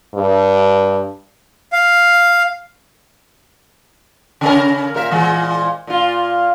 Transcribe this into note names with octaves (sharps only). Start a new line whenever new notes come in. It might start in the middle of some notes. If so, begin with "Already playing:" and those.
G2
F5
C#3 C#4 A#4
A#2 A#4 E5
A#2 E3 G#3
A#2 F4